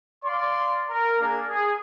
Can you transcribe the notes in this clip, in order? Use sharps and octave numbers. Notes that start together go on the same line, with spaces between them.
D5 F5 C6
A#4
A#3 D4 G#4 A#4
G#4